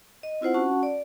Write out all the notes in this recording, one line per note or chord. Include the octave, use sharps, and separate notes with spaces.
D#5
C4 E4 F4 C5 F#5
C#4 F#4 F#5 A5 C#6
D5